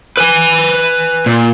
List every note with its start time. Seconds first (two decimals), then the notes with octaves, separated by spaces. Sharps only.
0.17 B4 G#5
1.26 A#2